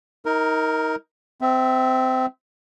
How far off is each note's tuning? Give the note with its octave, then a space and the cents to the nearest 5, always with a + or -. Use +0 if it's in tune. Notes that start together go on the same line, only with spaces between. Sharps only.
D#4 +30 A#4 +0
C4 -20 E5 +0